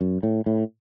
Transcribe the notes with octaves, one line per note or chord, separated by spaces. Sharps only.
F#2
A2
A2